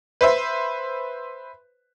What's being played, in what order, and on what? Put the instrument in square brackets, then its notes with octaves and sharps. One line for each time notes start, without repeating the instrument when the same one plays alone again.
[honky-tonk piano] B4 C5 E5